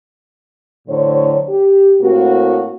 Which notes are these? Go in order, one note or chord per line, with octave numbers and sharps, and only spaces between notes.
A2 D3 F#3 C5 C#5
G4
A2 A#3 C4 F#4